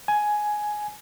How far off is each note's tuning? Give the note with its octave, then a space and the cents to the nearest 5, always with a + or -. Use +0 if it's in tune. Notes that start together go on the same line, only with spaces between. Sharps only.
G#5 +10